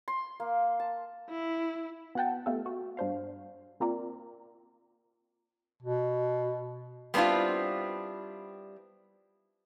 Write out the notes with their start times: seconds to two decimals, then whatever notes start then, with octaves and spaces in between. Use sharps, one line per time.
0.08 C6
0.40 A#3
0.80 A5
1.30 E4
2.15 B3 F#4 F#5 G5 A5
2.46 A3 B3 F4 G4 A4
2.66 F#4
2.97 G2 D4 C5 F5
3.80 A#3 C4 F4 A#4 D5
5.82 B2
7.14 G3 B3 C4 D4 E4 F4